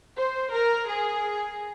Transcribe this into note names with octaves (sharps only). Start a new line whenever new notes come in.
C5
A#4
G#4